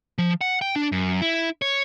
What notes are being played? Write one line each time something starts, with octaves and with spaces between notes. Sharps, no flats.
F3
F#5
G5
D4
F#2
E4
C#5